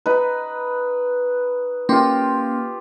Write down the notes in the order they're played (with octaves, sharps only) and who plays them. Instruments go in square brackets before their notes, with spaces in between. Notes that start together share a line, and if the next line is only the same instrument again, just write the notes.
[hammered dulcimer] D#4 B4
[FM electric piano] A#3 C#4 C6 [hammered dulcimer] F4 G4